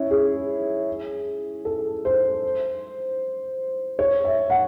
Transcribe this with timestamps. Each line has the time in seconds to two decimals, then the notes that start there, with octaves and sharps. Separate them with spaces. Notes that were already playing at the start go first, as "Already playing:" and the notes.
Already playing: C#4 E4
0.11 G#4
1.65 A4
2.05 C5
3.99 C#5
4.25 E5
4.50 F#5